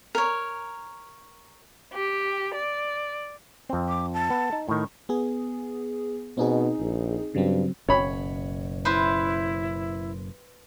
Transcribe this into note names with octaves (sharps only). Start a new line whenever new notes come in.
A#4 C#5
G4
D5
F2 C4
D6
A5
B3
D#4
A2 D#3 C#6
B3 G#4
B2 C4 D#4 G#4
A#1
G2 C#3 F#3 C4
F#1 B2 C#4 C#5 B5
E4 B4 C5 E5